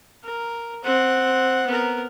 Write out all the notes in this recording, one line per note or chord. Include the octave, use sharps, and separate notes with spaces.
A#4
C4 F#5
B3 A#4